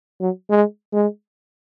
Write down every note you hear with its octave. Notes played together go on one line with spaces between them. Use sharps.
F#3
G#3
G#3